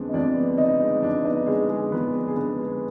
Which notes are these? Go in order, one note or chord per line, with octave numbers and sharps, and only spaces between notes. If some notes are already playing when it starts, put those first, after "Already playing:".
Already playing: F2 D3 G#3 B3 C4 D4 D5
D#5
F2 D4 D5
B3
D3 D#4 D#5
G#3
F2 D4 D5
B3 D#4 D#5
D3 G#3 G#4
G#3 G#4
F2 B3 B4
B3
G#4
D3 B3 B4
G#3